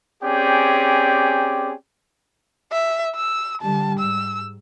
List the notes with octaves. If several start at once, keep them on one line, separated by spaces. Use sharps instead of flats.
C4 C#4 G4 G#4 D5 G5
E5
E6
D3 G3 A5
G#2 E6